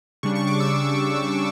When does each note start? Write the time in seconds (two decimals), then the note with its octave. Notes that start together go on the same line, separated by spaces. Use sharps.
0.23 C#3 G3 D4 C#6
0.35 C#6
0.47 D6
0.60 E6